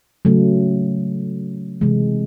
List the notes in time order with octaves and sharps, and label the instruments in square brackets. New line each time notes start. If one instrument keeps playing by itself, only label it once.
[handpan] C#3 F#3 A3
C3 E3 G#3